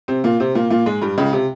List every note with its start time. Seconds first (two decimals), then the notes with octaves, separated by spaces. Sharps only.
0.08 C3 C4
0.24 A#2 A#3
0.40 C3 C4
0.55 A#2 A#3
0.70 A#2 A#3
0.86 G#2 G#3
1.02 G2 G3
1.18 C#2 C#3
1.33 C3